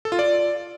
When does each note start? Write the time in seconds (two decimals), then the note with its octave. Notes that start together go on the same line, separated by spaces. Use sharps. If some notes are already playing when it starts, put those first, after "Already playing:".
0.05 A4
0.12 F4
0.19 D5